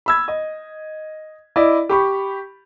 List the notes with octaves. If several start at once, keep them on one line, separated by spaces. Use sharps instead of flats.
B5 E6 G#6
D#5
E4 D5 D#5
G4 B5 C#6